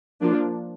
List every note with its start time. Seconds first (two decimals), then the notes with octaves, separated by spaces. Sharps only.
0.21 F3 A#3 D4 F4